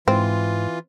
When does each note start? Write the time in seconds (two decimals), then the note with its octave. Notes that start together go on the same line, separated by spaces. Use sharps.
0.08 G#2 E3 C4 F4